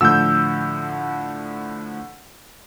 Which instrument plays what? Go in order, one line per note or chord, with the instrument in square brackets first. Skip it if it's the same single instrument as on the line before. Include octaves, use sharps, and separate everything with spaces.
[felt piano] A2 D3 F3 [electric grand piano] E6 G6